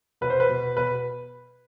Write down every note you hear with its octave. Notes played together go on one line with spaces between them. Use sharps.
B2 B4
C5
B4
B2
B2 B4